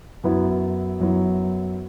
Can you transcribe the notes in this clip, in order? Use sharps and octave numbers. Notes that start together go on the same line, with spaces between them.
F#2 F#3 B3 E4
F#2 F#3 B3 E4